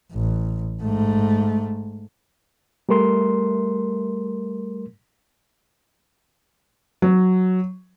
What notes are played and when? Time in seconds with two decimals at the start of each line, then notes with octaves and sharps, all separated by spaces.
0.13 A1
0.82 G#2 A3
2.89 G3 A3 A#4 C6
7.02 F#3